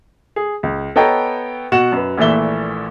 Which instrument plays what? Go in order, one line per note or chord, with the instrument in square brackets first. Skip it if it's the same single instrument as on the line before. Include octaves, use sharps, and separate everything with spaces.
[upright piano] G#4
C#2
B3 A4 C#5 D#5 G5 A#5
B2 F#4 F#5 E7
F#2 B4
A#1 A#2 E3 A3 E5 G7